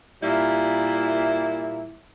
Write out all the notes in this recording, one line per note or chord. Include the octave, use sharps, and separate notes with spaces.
A#2 G3 A#3 E4